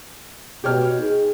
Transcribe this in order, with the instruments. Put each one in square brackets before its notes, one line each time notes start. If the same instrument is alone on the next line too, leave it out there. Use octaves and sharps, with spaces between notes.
[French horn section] B2 [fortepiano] G4 C#5 F6
[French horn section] D#4 G#4